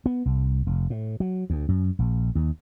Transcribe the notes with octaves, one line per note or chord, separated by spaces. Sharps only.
B3
C2
F1
A2
F#3
D2
F#2
A#1
D#2